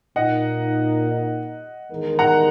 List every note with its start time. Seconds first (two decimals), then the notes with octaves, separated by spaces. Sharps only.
0.16 A#2 A#3 D#4 D#5 F#5
1.90 E2 D#3 G#3 D#4 A#4
2.19 F#5 A#5